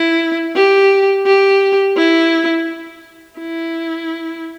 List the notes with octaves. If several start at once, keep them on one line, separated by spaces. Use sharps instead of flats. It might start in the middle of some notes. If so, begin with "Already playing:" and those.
Already playing: E4
G4
G4
E4
E4